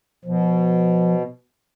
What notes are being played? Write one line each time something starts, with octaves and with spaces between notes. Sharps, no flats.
B2 F3